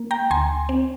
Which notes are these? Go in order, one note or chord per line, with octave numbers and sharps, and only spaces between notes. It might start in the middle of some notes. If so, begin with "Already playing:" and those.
Already playing: A#3
G5 A#5
D2 G#5 C6
C4